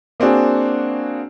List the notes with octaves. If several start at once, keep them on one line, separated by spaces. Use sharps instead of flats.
A#3 C4 D4 F#4 G#4